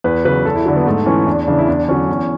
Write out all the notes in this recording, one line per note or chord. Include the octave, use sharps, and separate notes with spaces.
E2 B4
C#3 F#3 B4
E2 A4
E4
D3 F#3 D4
B3
G#2 A3
E3 C#4
E2 D4
C#3 E3 D4
E4
E2 D4
D3 F#3 C#4
E2